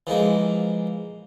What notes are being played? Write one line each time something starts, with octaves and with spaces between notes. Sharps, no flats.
E3 F3 G#3 A#3